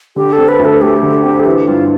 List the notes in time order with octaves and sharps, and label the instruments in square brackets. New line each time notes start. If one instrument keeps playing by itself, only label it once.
[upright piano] D3 [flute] G4
[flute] A4
[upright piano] C4
[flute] B4
[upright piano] D2
[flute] A4
[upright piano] A3 [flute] G4
[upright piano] D3
C4
[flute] A4
[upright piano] E3 [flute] G4
[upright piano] G2 [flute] F4